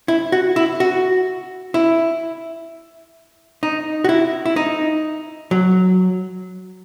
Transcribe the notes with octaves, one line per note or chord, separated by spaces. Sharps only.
E4
F#4
E4
F#4
E4
D#4
F#4
E4
E4
D#4
F#3